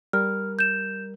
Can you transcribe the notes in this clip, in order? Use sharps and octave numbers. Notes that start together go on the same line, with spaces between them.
G3 A#4 F6
G6 E7